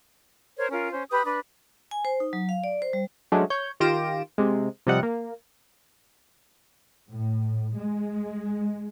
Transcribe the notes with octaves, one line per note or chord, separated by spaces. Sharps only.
A#4 C5 C#5
C#4 F4 A#4
C#4 C5
G4 B4 D#6
D4 B4
G#5
C5
D#4
F#3
F5
D5
C5
G3
F#3 G#3 A3 C#4 D4
C#5 G6
D#3 F4 G4 A#6 D7 E7
C3 G#3
C3 F3 G3 D#5 F#5
A#3
A2
G#3